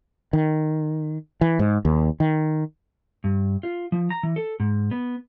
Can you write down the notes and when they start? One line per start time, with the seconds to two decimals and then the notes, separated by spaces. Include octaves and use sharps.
0.33 D#3
1.41 E3
1.59 G#2
1.85 D#2
2.20 D#3
3.24 G2
3.63 F4
3.92 F3
4.10 A#5
4.23 E3
4.36 A4
4.60 G#2
4.91 B3